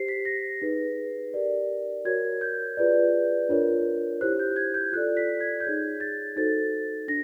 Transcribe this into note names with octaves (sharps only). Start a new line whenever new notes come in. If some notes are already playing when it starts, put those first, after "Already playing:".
Already playing: G4 C5 C7
B6
A#6
D#4 G#4 B4
G4 A#4 D5
F#4 A#4 C#5 G#6
G6
F4 G#4 B4 D5
D4 F4 A#4 C#5
E4 G4 C5 F#6
G6
G#6
G6
F4 A4 D5 F#6
B6
G#6
G6
D#4 G#4 C#5 G#6
A6
D#4 F#4 A4 C5 A6
D4 A#6